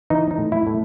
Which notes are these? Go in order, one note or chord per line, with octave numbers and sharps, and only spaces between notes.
E3 D#4
D#4
A2
E4
A2